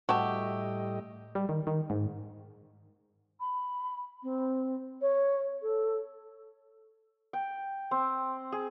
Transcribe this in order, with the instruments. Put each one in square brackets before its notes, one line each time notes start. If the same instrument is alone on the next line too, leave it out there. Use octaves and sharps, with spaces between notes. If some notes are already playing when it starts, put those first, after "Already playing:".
[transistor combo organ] A2 G3 D#5 [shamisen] F#4 A5 [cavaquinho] G4 E5 [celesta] C#6
[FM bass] G3
D#3
D#3
G#2
[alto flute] B5
C4
C#5
A4
[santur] G5
C4
G#4